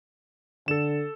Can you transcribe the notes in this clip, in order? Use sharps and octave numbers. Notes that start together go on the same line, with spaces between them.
D3 A4 E7